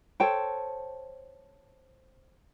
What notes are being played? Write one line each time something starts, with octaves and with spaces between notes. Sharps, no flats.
A4 C5 C#5 G5